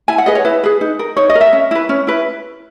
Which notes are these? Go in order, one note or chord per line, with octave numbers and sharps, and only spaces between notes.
E4 G#5
F#5
G#4 B4 D#5
C#5
E4 B4
G#4 B4
D#4
A#4
D#4 C#5
D#5
A#4
E5
C#4
E4 B4
C#4
E4 B4